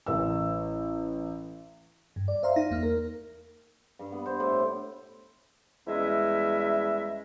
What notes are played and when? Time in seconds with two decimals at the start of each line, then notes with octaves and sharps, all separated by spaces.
0.06 A1 E6
2.16 G2
2.28 D5
2.43 C5 E5 F5 A#5 C6
2.56 D#4 A#6
2.71 E2 A#3 F6
2.83 A#4
3.99 G2
4.12 B3
4.26 C5
4.40 A2
5.86 E2 G3 G#3 C#4 E5